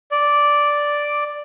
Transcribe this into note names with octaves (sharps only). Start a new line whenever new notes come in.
D5